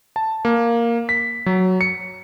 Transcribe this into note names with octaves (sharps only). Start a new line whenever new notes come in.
A5
A#3
B6
F#3
C#7